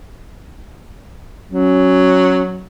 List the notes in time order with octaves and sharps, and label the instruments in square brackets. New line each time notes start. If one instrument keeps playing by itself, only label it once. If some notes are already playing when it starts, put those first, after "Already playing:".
[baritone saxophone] F#3 [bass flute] C#4